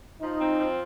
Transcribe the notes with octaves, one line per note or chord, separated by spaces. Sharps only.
F3 D#4
C4
F3